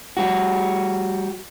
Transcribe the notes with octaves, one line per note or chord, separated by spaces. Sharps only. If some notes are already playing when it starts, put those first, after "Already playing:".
G3 F#4